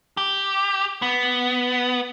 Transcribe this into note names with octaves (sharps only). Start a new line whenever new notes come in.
G4
B3